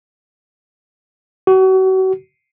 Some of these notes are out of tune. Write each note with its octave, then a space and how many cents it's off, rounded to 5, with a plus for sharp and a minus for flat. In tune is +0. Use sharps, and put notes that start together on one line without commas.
F#4 +35